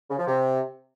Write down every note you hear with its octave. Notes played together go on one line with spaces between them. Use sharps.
C#3
F3
C3